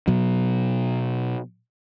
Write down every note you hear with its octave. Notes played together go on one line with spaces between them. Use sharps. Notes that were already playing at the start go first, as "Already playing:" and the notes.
B2 F#3